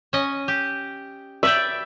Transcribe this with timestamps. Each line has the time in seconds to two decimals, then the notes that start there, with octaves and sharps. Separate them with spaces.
0.13 C#4 D#5
0.48 G4
1.43 B4 D5 E5 G5